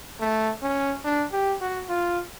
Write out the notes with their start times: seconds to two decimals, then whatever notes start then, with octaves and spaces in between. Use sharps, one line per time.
0.20 A3
0.63 C#4
1.05 D4
1.33 G4
1.61 F#4
1.89 F4